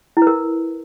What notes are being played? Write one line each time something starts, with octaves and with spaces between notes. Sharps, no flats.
E4
B4
A#4